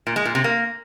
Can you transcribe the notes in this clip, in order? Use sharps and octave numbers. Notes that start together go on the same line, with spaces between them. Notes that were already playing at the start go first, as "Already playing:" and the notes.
A#2
G#3
A#2
C3
A#3